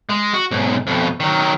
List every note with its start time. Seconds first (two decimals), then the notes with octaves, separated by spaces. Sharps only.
0.09 G#3
0.34 F#4
0.51 B1 G#2
0.87 F2 B2
1.20 D#3 F#3